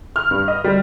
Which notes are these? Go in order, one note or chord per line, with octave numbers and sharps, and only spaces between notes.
F6
G2
D#5
G3